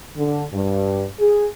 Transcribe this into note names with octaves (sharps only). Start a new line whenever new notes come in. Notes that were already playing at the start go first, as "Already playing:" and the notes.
D3
G2
G#4